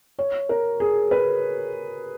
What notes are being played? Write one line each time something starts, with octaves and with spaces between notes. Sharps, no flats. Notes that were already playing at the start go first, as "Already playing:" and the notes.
C#5
A#4
G#4
B4